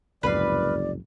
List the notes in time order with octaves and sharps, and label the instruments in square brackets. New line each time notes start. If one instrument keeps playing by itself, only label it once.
[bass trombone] F#1 [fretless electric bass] C2 F2 G#2 [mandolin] B4 F5 [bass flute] D5